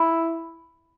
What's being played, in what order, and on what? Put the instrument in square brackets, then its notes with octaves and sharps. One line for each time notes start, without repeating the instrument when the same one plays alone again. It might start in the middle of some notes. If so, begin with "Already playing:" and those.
Already playing: [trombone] E4